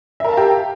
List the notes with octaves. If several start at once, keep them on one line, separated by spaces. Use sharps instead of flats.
G4 A#4 E5 F5 A5